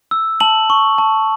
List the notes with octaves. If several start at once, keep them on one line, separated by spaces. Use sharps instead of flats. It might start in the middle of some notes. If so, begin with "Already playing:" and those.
E6
A5 F#7
C#6
A5